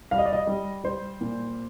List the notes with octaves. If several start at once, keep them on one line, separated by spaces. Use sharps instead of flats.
G3 F5
D#5
D5
D#5
G3
G3 C5
A#2